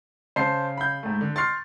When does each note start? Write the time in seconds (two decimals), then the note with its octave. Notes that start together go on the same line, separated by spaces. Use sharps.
0.36 C#3 C5 A5 C7
0.77 B5 G6
1.03 G#2 A3
1.21 D3
1.36 C6 C#6 F6 A6 C7